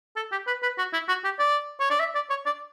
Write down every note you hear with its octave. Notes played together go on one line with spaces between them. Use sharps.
A4
G4
B4
B4
F#4
E4
F#4
G4
D5
C#5
D5
E5
D5
C#5
D5